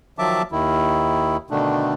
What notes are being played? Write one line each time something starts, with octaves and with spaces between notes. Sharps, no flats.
D#3 F3 F#3 E5 A5 D6
D#2 D#3 E4
B2 D3 D#3 A3 D4